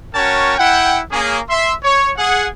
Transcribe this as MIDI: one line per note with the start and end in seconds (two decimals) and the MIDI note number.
0.14 0.55 61
0.14 0.55 66
0.14 0.55 70
0.14 0.55 73
0.14 0.55 79
0.14 0.55 81
0.58 1.00 64
0.58 1.00 78
0.58 1.00 79
1.11 1.38 58
1.11 1.38 61
1.11 1.38 68
1.50 1.73 76
1.50 1.73 84
1.83 2.10 73
2.17 2.47 68
2.17 2.47 78